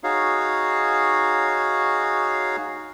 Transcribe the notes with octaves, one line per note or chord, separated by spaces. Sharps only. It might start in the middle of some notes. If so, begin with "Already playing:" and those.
D#4 F#4 G#4 C#5 F5